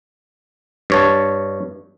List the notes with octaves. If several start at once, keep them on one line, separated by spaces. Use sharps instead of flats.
G2 C#5 A5